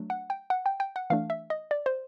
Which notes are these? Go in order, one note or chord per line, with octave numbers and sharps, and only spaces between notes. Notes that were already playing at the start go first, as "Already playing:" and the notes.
Already playing: F#3 A3 D4
F#5
G5
F#5
G5
G5
F#5
E3 A3 D4 F5
E5
D#5
D5
C5